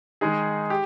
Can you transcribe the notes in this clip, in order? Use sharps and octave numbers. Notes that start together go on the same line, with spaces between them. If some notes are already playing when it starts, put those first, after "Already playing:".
D#3 G#3 D#4 G#4
G4